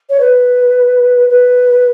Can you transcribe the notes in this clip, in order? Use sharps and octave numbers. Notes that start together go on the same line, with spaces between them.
C#5
B4
B4